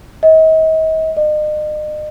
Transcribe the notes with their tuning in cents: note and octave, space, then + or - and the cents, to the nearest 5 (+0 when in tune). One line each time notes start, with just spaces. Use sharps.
D#5 +40
D#5 -40